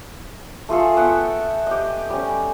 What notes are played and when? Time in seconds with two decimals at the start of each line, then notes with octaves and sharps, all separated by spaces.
0.69 A3 F4 G#4 A4
0.97 B3 E5 F#5 G5
1.66 G4 D#5
2.10 G3 C#4